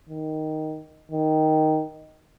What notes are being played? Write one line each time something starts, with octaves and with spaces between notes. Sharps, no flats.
D#3
D#3